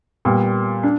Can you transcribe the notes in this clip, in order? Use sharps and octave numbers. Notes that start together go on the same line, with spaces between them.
A#2 G3 B3
D4